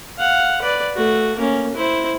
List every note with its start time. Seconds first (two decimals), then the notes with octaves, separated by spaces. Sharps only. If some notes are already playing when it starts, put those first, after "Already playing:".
0.18 F5 F#5
0.62 B4 D5
0.96 A3 F#4
1.38 A#3 C#4
1.75 E4 C5